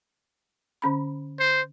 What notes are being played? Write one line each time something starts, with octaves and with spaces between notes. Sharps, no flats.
D3 C#4 B5
C5